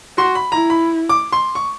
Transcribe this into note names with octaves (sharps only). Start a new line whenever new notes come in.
F#4 C6
B5
E4 A#5
B5
D6
C6
C#6